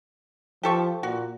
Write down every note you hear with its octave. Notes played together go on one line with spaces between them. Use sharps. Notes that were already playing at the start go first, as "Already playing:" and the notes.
F3 G4 A4 C#6
A#2 F#4